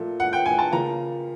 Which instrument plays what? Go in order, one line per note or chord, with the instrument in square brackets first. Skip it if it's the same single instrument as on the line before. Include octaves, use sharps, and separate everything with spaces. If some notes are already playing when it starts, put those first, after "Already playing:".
Already playing: [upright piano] A#2 F3 A3
F#5
G5
G#5
A5
C#3 F3 A#3 A#5